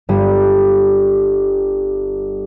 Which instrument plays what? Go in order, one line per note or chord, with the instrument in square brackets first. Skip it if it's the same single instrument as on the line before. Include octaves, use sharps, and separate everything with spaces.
[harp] G1 G2 G3 D#7